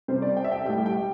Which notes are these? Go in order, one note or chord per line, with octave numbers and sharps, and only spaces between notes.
C3 G3 C5
D5
G5
E5
G5
A2 G3 G5
G5